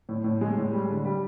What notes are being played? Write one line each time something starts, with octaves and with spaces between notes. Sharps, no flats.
A2
A2
G#3
A2
G3
D3
G3